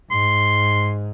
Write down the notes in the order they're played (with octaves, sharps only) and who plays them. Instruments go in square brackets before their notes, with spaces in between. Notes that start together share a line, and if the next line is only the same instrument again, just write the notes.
[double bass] G#2 [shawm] C6